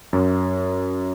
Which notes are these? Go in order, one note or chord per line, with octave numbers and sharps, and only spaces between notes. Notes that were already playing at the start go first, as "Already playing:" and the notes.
F#2